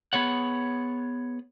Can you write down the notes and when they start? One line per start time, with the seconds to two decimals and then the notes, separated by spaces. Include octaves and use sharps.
0.13 B3 G#4 C#5 F#5